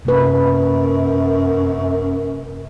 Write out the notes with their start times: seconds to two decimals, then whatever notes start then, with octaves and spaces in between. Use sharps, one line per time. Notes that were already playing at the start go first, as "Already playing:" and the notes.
0.05 F#2 C3 A#3 B4